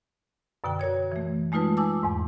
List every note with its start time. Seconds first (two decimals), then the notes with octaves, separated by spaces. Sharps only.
0.64 F#2 B2 D3 G5
0.79 F#4 A#4 C#5 G#6
1.12 E3 A3
1.52 G#3 A3 D#4 F4 B4 A5
1.77 D#4 G#5 A5 D6 E6
2.03 E2 G#2